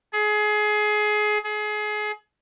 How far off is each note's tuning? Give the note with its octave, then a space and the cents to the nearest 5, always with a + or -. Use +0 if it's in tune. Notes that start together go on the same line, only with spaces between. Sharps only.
G#4 +25
G#4 +30